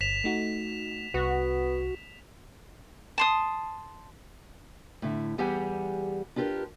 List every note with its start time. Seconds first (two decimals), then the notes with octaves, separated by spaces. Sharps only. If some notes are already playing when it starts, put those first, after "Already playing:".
0.01 G1 B6 E7 F7
0.24 A3 D#4 F#4
1.14 C2 B3 F#4
3.18 A5 C6 D#6
5.02 A2 D3 E5
5.38 E2 G3 G4 G#4 F#5 G#5
6.36 D4 F4 G4 A#4 B4